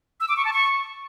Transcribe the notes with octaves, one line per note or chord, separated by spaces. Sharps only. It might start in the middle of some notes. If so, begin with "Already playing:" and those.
E6
D6
C#6
A5
C#6